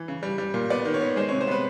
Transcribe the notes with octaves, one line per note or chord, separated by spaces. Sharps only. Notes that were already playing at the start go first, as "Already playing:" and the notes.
Already playing: E3
C#3
G3
G3
A#2
B3 D5
D#3
C#5
B3
G#3 C5
C#5
C3
C5
B3 B4